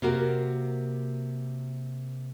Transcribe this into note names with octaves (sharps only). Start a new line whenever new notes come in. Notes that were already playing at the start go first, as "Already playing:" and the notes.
C3 A#3 F#4 A#4